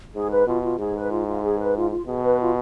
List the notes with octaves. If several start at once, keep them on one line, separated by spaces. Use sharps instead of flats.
G#2 G#4
B4
B2 F4
F4
G#2 G#4
B4
F4
F4
G#4
B4
F4
F4
B2 G#4
B4
F4